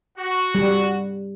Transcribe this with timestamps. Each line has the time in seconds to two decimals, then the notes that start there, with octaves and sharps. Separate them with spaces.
0.18 F#4
0.55 G3